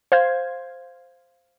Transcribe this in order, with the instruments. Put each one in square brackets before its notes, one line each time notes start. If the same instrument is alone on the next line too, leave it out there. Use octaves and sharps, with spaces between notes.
[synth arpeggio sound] C5 F5 G#6